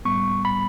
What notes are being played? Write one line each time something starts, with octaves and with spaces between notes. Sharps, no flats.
A2 G3 B3 C#6
B5